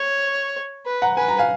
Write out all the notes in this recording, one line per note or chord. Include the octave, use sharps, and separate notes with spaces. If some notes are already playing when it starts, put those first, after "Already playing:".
Already playing: C#5
B4
F#5 A#5
B4 G#5
A#5
F5 G#5